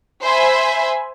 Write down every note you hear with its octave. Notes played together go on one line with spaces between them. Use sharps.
C5 E5 G#5 B5